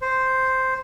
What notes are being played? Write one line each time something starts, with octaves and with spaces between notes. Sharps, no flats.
C5